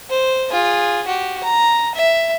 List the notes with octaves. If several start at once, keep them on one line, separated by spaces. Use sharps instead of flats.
C5
F4 G#4
F#4 G4
A#5
E5